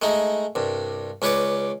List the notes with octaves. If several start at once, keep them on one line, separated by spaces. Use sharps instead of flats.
G#3 A3 D#4
C2 G2
C#2 C#4 B4 C#5 D5 D6